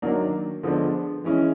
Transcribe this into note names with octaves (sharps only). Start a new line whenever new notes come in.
D#3 F#3 A#3 D4
D3 F3 G#3 B3 D4
E3 G#3 C#4 E4